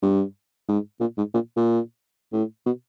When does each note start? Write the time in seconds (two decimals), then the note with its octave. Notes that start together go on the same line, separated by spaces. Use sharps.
0.02 G2
0.68 G#2
1.01 A#2
1.18 G#2
1.34 A#2
1.56 A#2
2.33 A2
2.66 B2